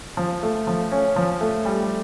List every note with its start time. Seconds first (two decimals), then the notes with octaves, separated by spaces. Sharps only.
0.17 F3
0.43 A3
0.67 F3
0.91 C#4
1.16 F3
1.41 A3
1.65 G3